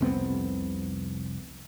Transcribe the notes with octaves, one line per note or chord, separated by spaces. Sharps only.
F1 C2 B3 C4